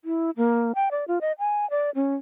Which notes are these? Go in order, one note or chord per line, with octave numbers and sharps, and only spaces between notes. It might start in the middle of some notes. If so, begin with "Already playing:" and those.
E4
A#3
G5
D5
F4
D#5
G#5
D5
C#4